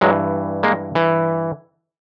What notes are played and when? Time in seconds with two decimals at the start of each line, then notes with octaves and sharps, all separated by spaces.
0.01 G2 E3 F#3 G#3
0.63 G#3 A#3
0.95 E3